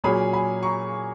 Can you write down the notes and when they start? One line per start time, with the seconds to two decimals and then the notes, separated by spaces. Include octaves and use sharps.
0.04 A#2 F#3 C#4 G#4 G#5 B5
0.33 G#5 B5
0.63 A#5 C#6